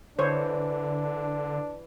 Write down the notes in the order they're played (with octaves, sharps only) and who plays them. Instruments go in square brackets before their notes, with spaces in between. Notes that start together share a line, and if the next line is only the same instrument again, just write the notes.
[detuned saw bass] D3 [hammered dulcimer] E3 [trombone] D4 [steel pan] C5 C#5